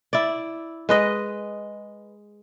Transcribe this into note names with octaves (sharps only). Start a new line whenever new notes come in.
E4 D5
G#3 B4 D#5